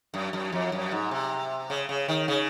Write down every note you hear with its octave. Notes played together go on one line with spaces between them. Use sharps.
F#2
F#2
F2
F#2
G#2
C3
C#3
C#3
D#3
C#3